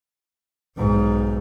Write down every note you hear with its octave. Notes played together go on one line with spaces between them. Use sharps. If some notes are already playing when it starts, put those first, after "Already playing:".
B1 G#2